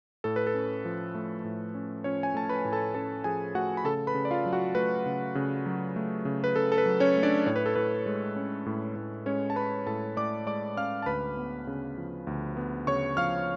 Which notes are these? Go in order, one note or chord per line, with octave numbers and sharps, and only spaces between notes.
A2 A4
B4
A4
C#4
F3
A3
A2
C#4
F3 C#4 C#5
G#5
A3 A5
B4 B5
A2
A4 A5
C#4 A4 A5
F3 G#4 G#5
A3 F#4 F#5
B5
C#3 A4 A5
B4 B5
C#3
D5
F4 F5
F#3
F#4 F#5
A3 B4
C#3
C#3
F#3
A3
C#3
B4
C#3 A4
A4
B4
F#3
C#4 C#5
A3
D4 D5
A2 C#5
B4
A4
A2 B4
G#3
C#4
A2
A2
G#3 C#4 C#5
A5
C#4 B4 B5
A2 A4 A5
A2 D5 D6
G#3 D5 D6
C#4 F5 F6
A5
D2 B4 B5
B3
C#3
F3
D2
B3
C#3 C#5 C#6
F3 F5 F6